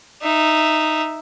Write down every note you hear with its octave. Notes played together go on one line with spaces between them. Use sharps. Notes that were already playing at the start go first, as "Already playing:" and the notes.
D#4 E5